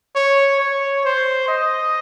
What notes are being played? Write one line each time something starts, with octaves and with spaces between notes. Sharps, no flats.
C#5
C#5
C5
D#5